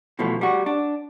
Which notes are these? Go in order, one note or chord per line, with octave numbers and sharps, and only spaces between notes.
B2 E3 F3 A3
G3 F#4
D4